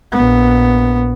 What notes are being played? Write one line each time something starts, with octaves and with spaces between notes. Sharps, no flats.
A#1 B3